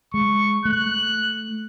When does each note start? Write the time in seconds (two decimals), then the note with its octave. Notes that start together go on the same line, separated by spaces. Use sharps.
0.14 G#3 C#6
0.65 A3 F#6